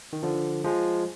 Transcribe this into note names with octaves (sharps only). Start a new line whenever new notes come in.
D#3
D3 F3
F3 G#3